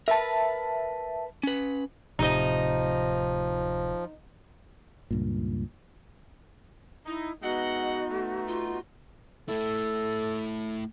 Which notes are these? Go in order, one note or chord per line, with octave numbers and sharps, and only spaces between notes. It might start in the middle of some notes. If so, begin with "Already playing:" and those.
A#4 B4 E5 A5
C#4 B4
D1 C3 F3 D#4 D#5
C#2 G2 A#2
D#4 E4
G#3 B3 D#4 F#4 D#5 E5 F#5
A3
F4
A3 E4 A4